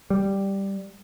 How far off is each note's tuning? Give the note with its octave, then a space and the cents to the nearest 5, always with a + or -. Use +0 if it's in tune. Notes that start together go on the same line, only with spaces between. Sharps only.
G3 +0